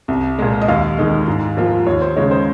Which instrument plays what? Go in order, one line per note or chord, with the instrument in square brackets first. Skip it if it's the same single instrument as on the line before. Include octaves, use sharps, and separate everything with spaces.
[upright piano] C2
A#2 G#3
D#5
D#2 F5
D#3 G#3 D#4
G#2
F3 A#3 F4
D#2 C#5
C5
C#3 G#3 D#4 C#5
C5